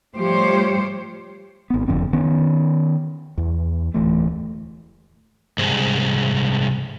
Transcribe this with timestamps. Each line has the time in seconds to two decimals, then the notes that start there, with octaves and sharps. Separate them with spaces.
0.17 F3 G3 A3 G4 C5 C#5
1.70 G#1 B3
1.88 F#1 F2 D3 C4
2.13 D#3 B3 C#4
3.38 E2
3.94 D1 E3 A3
5.58 C2 G#2